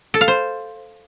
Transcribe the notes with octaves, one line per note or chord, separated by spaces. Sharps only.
A4
F5
C5